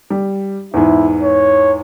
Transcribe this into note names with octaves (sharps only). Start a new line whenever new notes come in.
G3
E2 G#2 E4
C#5